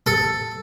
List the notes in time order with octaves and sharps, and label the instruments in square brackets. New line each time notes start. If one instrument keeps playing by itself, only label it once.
[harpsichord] A4